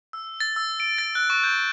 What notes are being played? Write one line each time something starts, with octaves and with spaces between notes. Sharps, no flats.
E6
A6
E6
D7
A6
F#6
C#6
G6